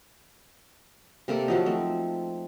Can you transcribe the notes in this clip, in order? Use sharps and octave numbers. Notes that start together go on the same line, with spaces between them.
C3 A#3 A4 D5
F3 F#3 D#4
A3 C4